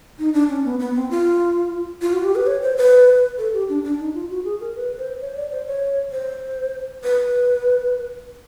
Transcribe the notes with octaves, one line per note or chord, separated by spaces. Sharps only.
D#4
D4
C#4
B3
B3
C4
F4
F4
F#4
G4
B4
C#5
C5
B4
A4
G4
D4
D4
D#4
F4
F#4
G#4
A#4
B4
C5
C#5
D5
C5
C#5
C5
B4